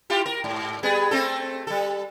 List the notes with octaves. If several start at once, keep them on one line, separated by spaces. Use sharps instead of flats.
E4 F4 G4
A#4
G#2
G3 B3 G#4
A3 C4 A4
G3 A4